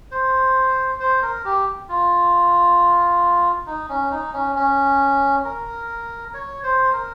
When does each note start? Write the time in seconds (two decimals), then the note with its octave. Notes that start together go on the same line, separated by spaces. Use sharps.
0.11 C5
1.00 C5
1.22 A#4
1.45 G4
1.89 F4
3.66 D#4
3.89 C#4
4.11 D#4
4.33 C#4
4.56 C#4
5.45 A#4
6.34 C#5
6.63 C5
6.93 A#4